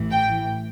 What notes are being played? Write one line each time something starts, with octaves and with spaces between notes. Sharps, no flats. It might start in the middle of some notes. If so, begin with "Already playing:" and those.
Already playing: A1 A2 E3
G5